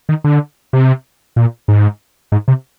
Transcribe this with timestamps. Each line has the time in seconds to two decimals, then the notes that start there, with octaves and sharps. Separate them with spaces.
0.09 D#3
0.24 D3
0.73 C3
1.36 A#2
1.68 G#2
2.32 G#2
2.48 C3